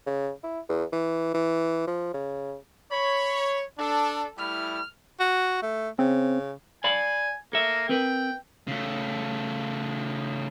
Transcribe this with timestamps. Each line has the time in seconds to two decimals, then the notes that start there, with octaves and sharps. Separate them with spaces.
0.06 C#3
0.43 E4
0.69 E2
0.93 E3
1.34 E3
1.87 F3
2.14 C#3
2.91 C#5 B5
3.79 D4 A4
4.38 G3 A3 E4 F6
5.20 F#4
5.62 A3
5.99 C#3 C4
6.84 D5 F5 G#5 B5
7.53 A#3 A4 E5
7.89 C4 A#4 B4 G5
8.67 C#3 A3